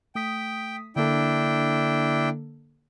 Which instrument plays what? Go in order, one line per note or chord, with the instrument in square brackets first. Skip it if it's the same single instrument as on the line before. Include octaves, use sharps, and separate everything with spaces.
[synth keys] A3 D#6 B6 [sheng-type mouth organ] G5
[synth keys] D3 A#3 A4 [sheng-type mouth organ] D4 E4 G5